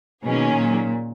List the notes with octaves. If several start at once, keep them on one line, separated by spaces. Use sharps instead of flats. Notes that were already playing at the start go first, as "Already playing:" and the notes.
B2 D#3 F#3 A#3 C#4 G#4
A#2